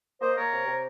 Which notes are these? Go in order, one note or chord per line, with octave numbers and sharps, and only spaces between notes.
A#3 C5 D#5
A#3 A#4 C#5
C3
C3